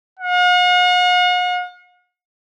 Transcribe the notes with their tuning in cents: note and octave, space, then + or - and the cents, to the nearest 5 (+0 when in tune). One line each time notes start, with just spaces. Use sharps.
F#5 -45